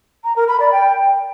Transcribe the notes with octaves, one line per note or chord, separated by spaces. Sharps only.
A#5
A#4
B5
D5
G5